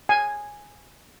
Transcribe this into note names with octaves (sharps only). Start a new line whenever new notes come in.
G#5